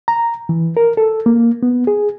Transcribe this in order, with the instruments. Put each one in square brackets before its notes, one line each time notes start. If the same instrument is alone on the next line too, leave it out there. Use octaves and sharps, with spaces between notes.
[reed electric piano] A#5
E3
A#4
A4
A#3
B3
G#4